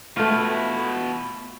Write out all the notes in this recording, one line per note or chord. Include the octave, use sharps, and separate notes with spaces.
B2 A3 E4 F4